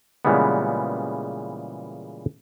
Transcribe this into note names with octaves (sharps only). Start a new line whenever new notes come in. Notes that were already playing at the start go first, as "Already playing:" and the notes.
A#2 C#3 E3 G3 G#3 B3